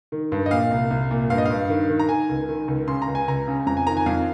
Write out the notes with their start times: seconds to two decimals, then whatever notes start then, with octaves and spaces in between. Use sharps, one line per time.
0.12 D#3
0.32 G2
0.46 D#5
0.51 A#2 F5
0.71 C2
0.90 C2
1.11 A#2
1.30 G2 F5
1.38 D#5
1.45 G2 F5
1.70 D#3
1.89 D#3
1.99 A#5
2.09 D#3 G#5
2.29 C#2
2.49 D#3
2.68 C#2
2.88 C#3 C6
3.02 A#5
3.07 C#2
3.15 G#5
3.28 C#2 A#5
3.48 C#3
3.66 F2 A#5
3.77 G#5
3.87 D#3 A#5
3.97 G#5
4.06 F2 F5